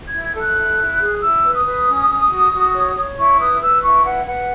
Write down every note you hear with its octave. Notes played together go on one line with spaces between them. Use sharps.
E4 G#6
G#6
A4 F#6
E4
E4
G#4
E4 E6
B4
D#6
B4
C#4
C#4
F#4
F#4
C#5
C#5
E4 C#6
B4 D#6
B4 E6
E4 C#6
B4 F#5
B4 F#5